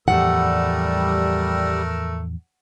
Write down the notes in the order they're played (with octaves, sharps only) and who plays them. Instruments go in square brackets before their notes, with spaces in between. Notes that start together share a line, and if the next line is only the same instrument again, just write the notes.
[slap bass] E2 A2 F3 [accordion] G3 [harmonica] A3 A#4 E6 [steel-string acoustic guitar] F#5